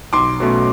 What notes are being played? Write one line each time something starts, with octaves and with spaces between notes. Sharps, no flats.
B1 C6 D6
B2 F#3 A3 C#4